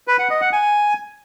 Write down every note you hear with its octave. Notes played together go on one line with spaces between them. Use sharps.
B4
F#5
D#5
F#5
G#5